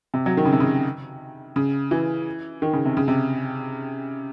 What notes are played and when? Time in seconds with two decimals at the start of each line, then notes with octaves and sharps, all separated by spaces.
0.14 C3
0.26 F#3
0.37 D#3
0.45 C#3
0.52 C3
0.60 C#3
1.56 C#3
1.91 E3
2.62 D#3
2.73 C#3
2.85 C3
2.97 C#3
3.08 C3